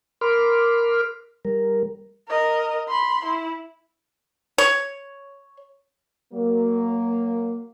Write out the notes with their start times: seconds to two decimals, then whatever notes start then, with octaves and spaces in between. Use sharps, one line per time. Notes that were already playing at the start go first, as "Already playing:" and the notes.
0.21 A#4 B5 C6 D6 F6
1.45 G3 A#4
2.28 A#4 D#5
2.88 B5 C6
3.25 E4
4.58 C#5
6.34 F#3 A#3